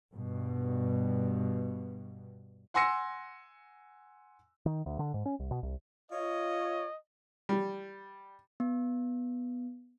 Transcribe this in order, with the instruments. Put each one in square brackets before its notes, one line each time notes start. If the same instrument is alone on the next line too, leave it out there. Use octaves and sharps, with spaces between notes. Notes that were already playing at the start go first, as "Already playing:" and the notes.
[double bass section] G2 B2
[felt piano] F#5 G#5 C6 E6 A#6 C#7
[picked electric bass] D#3
D2
D3
G#2
C#4
C2
B2
C2
[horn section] F4 C#5 [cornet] D#5
[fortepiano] G3
[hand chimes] B3